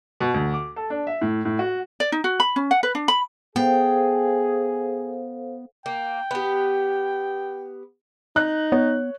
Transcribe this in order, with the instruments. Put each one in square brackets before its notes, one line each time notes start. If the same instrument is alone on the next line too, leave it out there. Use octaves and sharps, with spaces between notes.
[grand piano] B2
D2
D6
A4
D4
E5
A2
A2
F#4
[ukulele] D5
D#4
F#4
B5
C#4
F#5
B4
D4
B5
[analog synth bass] B3 [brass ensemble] G#4 [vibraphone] A4 C5 F5 [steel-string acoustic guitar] G5
[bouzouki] A#3 [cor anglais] G5
[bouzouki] B3 G4
[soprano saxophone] D#4 [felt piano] F#6
[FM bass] B3 [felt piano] C#5